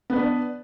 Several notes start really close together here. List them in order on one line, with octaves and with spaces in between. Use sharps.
B3 B4 D4